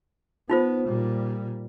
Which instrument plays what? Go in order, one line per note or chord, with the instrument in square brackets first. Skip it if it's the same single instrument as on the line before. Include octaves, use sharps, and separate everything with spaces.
[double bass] B3 [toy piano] D#4 F4 C5
[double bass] A#2 G3